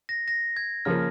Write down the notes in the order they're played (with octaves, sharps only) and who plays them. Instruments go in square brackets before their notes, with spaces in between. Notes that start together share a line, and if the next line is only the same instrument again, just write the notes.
[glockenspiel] A#6
A#6
G#6
[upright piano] C#3 F3 A#3 [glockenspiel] F6